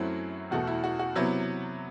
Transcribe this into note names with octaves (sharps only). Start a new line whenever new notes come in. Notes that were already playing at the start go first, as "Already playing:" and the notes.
Already playing: F#2 F#3 A3 C4 E4
E2 B2 A3 F#4
E4
F#4
F#4
C3 F#3 B3 E4